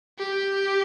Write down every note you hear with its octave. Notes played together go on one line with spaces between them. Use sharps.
G4